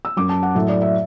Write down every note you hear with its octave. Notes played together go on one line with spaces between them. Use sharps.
E6
F#2 F#3 D6
A5
F#5
A2 F#3 E5
D5
E5